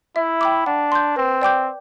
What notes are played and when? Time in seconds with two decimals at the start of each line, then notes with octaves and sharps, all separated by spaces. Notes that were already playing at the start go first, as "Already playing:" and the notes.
0.16 E4 E5
0.41 G5 B5 D6
0.66 D4 F#5
0.92 C6 G6
1.16 C4 B4
1.42 D5 G5 D6 G6